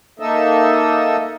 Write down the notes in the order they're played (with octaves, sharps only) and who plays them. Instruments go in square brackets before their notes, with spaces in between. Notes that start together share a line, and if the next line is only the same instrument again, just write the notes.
[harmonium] A#3 D#4 A4 D#5 E5